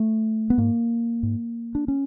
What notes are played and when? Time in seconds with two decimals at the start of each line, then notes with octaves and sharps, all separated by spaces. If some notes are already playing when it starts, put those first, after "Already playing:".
Already playing: A3
0.50 B3
0.58 G#2 A#3
1.23 G#2
1.75 D4
1.88 C#4